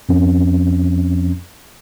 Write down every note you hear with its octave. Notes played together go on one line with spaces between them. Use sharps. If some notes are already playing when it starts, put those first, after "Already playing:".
F2 F3 C4 C#4